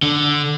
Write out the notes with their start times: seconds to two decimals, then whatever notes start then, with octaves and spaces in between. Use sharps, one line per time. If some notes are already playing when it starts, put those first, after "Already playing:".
0.03 D3